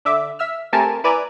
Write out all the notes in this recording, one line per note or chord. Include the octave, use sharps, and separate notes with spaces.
D3 E5 D6
E5 E6 F6
A3 C4 G4 A#4 G#5 A5
E4 B4 D5 G#5 A#5